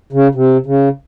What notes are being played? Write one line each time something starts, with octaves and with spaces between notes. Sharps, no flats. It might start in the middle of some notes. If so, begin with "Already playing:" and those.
C#3
C3
C#3